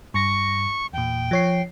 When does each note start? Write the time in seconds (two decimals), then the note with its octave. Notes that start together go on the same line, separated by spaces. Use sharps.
0.14 G2 C#6 A#6
0.93 E2 A#2 G5
1.31 F3 C#5 C7